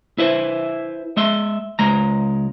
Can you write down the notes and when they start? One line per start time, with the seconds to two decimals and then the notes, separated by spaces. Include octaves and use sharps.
0.18 E4 B4 C5 E5
1.17 G#3 E5 C6
1.79 C#2 G#3 A#5